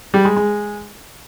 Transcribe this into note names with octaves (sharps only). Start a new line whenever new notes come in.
G3
G#3
G#3